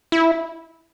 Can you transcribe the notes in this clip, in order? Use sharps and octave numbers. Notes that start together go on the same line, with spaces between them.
E4